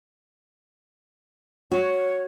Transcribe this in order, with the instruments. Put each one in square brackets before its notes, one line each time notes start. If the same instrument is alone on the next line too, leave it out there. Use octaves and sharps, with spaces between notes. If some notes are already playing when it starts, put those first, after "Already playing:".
[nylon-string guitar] F#4 [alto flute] C#5